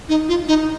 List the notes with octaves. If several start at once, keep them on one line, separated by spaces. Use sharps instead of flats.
D#4
F4
D#4